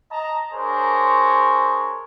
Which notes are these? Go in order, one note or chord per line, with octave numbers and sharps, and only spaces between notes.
D#5 A5 A#5
D4 G#4 A#4 C5 C#5